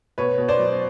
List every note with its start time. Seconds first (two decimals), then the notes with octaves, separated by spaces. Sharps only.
0.18 B2 B4 C#5
0.38 B2
0.48 C5 D5
0.59 F#3